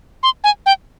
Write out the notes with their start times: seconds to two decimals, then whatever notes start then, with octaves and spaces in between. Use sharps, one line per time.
0.23 C6
0.44 G#5
0.66 G5